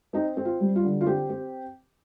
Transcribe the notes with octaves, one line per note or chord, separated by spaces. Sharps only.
C4 D#4
C4
F4
G3
F4
D3
F4
C4 G4
C4